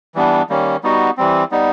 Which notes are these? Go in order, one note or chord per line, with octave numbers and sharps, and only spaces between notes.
E3 G3 B3 D4
D#3 G3 A#3 C#4
G3 B3 D#4 F#4
E3 G3 C4
G3 B3 D#4